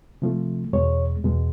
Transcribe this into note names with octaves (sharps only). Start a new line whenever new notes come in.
C3 F3 A3
E2 B2 G#3 C#5
E2 B2 G#3